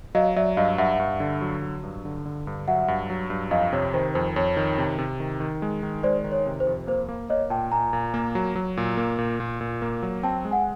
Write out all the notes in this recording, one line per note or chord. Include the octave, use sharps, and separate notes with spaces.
F#3 D#5 F5
F#3 D5 E5
G2 D#5 F5
G2 E5 F#5
G2
D3
F#3
F#3
G2
D3
D3
G2
F#3 E5 F#5
G2
F#3
G2
F2 D#5 F5
C3 C#5
D#3 C5
F2 C5
F2 C#5
D#3
C3
C3
D#3
D#3
G#3
D#3
G#3 C5 D5
D#3
C#5
C3
C5
F2
A#3 C5
A#3
A#3 C#5 D#5
A#2 G5 A5
A#2 G#5 A#5
A#2
A#3
F#3
F#3
A#2
A#3
A#2
A#2
A#2
A#3
F#3
C4 G5 A5
G#3
F#5 G#5